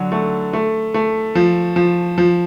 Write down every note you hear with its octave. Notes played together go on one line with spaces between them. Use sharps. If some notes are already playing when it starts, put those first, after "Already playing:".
Already playing: D3 F#3
A3
A3
A3
F3
F3
F3